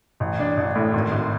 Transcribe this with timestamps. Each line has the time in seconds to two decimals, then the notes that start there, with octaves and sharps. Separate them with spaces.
0.20 A1
0.39 D4
0.57 A1
0.75 A2
0.93 G#1
1.12 G#1